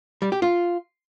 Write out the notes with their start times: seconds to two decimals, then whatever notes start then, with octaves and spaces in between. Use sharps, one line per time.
0.22 G3
0.32 G4
0.42 F4